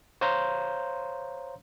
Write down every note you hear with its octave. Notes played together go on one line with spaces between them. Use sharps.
C5 C#5 F5 A#5 C6 G6